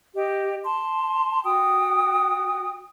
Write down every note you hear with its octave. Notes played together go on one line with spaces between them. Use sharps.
G4 D#5
A5 C6
F#4 G5 D#6